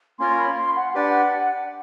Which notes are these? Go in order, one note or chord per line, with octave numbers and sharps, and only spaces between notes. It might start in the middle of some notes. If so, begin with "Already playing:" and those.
A#3 C#4 F4 A#4 C#5 C6
B5
C6
F#5
D4 G4 B4 D5 F#5